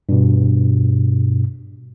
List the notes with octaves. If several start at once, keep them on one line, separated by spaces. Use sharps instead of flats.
G2 B2